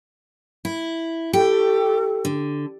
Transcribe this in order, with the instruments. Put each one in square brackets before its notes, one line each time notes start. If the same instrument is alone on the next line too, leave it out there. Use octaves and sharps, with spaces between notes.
[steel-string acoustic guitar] E4
[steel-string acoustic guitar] G4 [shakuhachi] A4
[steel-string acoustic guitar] D3